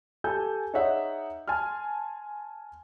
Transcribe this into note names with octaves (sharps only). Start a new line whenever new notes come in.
G4 A4 G#5 G6
D#4 G#4 C#5 D5 E5 F#5
G#5 A5 C6 F6